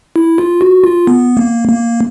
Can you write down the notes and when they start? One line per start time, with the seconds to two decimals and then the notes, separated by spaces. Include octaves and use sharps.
0.16 E4
0.38 F4
0.61 F#4
0.84 F4
1.07 B3
1.37 A#3
1.68 A#3